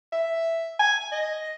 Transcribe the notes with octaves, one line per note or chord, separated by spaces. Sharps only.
E5
G#5
D#5